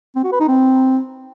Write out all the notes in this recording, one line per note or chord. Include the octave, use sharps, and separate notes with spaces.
C4
F#4
B4
D#4
C4